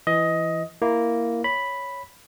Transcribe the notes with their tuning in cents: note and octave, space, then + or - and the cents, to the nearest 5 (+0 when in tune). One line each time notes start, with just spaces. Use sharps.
E3 +15 D#5 +15
A#3 +0 E4 +5
C#5 +0 B5 +0